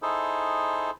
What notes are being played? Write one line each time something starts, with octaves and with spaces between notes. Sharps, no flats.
D#4 E4 G#4 A4 C5